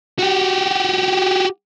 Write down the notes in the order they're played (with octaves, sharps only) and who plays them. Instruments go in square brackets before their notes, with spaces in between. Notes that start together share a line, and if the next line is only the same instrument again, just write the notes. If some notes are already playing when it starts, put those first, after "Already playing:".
[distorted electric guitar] F#4 G4